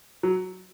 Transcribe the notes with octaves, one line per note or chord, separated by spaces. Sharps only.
F#3